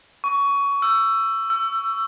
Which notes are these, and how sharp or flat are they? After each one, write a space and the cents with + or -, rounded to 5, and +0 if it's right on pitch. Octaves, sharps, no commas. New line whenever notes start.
C#6 +20
E6 +20
E6 +30